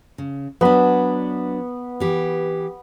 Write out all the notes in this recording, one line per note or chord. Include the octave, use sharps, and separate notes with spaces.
C#3
F#3 B3 D4 B5
E3 G4